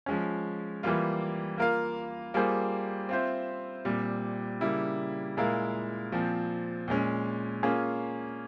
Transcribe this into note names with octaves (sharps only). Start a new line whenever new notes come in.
F3 G#3 C#4
E3 G3 A#3 F4
A#3 F4 A#4 F5
G3 A#3 F4 G#4 C5
C4 F4 C5 E5
A#2 G3 C4
C#3 G3 A#3 E4
A#2 G#3 E4 A#4 F5
A#2 F3 C4
A#2 G#3 C#4
A#3 C#4 F4 G#4